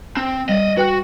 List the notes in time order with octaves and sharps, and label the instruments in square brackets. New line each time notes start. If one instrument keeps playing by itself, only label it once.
[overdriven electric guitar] C4
[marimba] G3 [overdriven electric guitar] D5 D#5
[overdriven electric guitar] F#4 [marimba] B4 G5 F#6